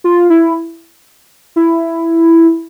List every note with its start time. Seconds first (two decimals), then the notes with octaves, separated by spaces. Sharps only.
0.04 F4
0.30 E4
1.56 E4